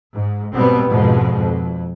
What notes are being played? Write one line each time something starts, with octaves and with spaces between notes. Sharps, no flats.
G#2
G#2 B2 G3 B3 C4
F2 G#2 B2 F3 G#3
F2